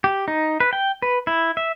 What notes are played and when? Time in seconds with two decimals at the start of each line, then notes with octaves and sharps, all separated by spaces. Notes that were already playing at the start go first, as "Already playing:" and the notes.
0.04 G4
0.28 D#4
0.60 B4
0.73 G5
1.02 B4
1.27 E4
1.57 E5